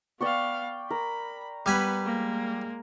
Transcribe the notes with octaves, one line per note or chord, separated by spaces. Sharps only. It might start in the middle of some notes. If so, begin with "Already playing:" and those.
B3 D5 F5 G5 C#6
A#4 B5
G3 B3 B4 G#5 B5
G#3 A#3